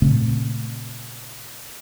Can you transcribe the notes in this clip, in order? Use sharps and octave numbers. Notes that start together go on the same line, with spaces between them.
A#2 C#3 A3 C4